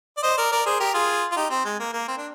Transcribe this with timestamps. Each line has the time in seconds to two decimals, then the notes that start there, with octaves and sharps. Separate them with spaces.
0.17 D5
0.23 C5 D#5
0.37 A#4 D5
0.52 A#4 D5
0.66 G#4 C5
0.80 G4 A#4
0.94 F4 G#4
1.32 F4
1.36 D#4 G4
1.50 C4
1.65 G#3
1.80 A#3
1.93 A#3
2.08 C4
2.17 D4